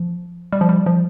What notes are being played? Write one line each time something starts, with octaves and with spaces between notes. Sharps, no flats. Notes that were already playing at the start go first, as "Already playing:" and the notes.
Already playing: F3
G3
F3
G3
F3